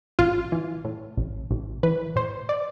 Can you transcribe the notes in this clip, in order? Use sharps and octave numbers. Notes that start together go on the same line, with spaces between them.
A1 F4
E3
A2
A1
A1
E3 B4
A2 C5
D5